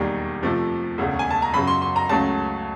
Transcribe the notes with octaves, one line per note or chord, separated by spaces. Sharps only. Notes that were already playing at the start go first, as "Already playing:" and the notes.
Already playing: E1 D#2 D#3 G3
F2 C3 F3 A3
E1 D2 C#3
G#5
A5
A#5
F#2 C#3 F#3 B5
C6
C6
A#5
C#2 C#3 F#3 A3 A5